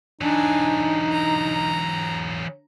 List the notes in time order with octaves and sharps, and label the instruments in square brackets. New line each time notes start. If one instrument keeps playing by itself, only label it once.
[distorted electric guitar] E3 F#3 [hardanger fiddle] D4 G#5 [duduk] D#4
[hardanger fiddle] A#5